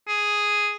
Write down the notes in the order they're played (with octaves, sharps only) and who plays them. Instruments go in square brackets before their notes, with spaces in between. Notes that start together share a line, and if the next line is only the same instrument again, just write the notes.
[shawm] G#4